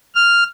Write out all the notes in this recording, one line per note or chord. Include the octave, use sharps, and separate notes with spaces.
F6